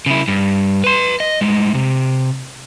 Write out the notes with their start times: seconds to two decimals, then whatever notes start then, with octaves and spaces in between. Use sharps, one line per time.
0.06 C#3 E4
0.28 G2
0.84 B4 C6
1.20 D#5
1.41 A2 G#3
1.74 C3